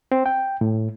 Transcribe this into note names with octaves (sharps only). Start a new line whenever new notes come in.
C4
G5
A2